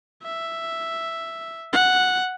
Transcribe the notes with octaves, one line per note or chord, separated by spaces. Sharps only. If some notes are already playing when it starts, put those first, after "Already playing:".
E5
F#5